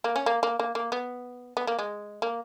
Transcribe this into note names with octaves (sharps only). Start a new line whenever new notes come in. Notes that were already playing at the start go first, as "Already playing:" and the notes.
A#3
C#4
A#3
A#3
A#3
A#3
B3
B3
A#3
G#3
A#3